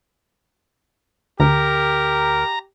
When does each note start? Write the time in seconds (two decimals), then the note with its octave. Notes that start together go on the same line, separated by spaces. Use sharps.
1.40 D2 G4 A#4 A#5